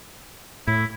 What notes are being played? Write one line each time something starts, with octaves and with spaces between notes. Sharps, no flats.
A2 E4